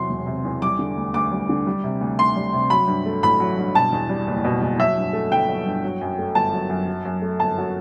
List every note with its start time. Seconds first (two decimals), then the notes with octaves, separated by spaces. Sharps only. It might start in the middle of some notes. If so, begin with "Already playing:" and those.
Already playing: E2 C3 F#3 C6
0.09 E1
0.27 C3
0.45 E2
0.62 G3 D6
0.79 D3
0.97 D2
1.14 D2 D6
1.31 G3
1.49 D3
1.67 G3
1.84 C3
2.01 D2
2.19 D2 C6
2.36 G3
2.53 C3
2.70 F#3 B5
2.87 G2
3.06 A3
3.23 A1 B5
3.40 F#3
3.58 G2
3.75 B2 A5
3.92 E2
4.09 G3
4.27 F#1
4.44 B2
4.61 E2
4.79 F#3 E5
4.97 G2
5.13 A3
5.31 G1 G5
5.49 F#3
5.65 G2
5.84 F#3
6.01 F#2
6.19 A3
6.35 G1 A5
6.53 F#3
6.70 F#2
6.87 F#3
7.05 F#2
7.22 A3
7.40 G1 A5
7.58 F#3